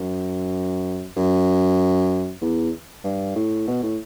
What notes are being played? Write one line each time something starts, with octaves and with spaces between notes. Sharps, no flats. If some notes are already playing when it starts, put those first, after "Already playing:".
Already playing: F#2
F#2
E2
G2
A2
B2
A2